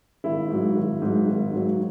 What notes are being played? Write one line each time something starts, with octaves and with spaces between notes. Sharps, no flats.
G#1 E4
G#2 F#3
G#1
G#2 F#3
G#1
G#2 F#3